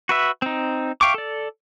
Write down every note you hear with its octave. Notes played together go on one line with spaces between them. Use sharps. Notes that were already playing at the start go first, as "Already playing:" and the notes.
F#4 B4 E5
C4 D#4
E5 F5 G5 C#6 D6
A4 D5